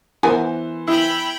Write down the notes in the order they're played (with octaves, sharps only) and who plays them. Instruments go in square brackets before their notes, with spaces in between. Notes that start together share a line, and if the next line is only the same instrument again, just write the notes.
[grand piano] E3 C5 [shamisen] B3 A#4 G#5
[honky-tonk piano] E4 [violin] G5 B5